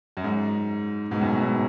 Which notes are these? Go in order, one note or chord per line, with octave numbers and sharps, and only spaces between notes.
F#2
G#2
G#2 B2
F#2 A2
F#2 A2
G#2 B2